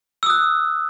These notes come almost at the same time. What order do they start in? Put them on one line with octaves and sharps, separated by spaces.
E6 D#6 F#6